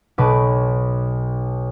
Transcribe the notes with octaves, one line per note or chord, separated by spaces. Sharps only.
B1 B2 B4 D6